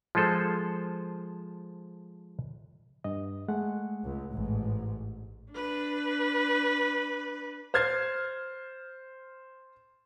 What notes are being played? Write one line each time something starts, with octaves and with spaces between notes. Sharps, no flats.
F3 G#3 F4 A4 C5
G2 D#5
G#3 A3 F#5
C#2
A1 G#2
D4 B4
C5 F6 G#6 A6 C7